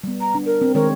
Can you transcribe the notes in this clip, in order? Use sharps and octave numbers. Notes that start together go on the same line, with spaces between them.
G3 B3
A#5
D4
A#4
C4
D#3 G#3 A#4 C#5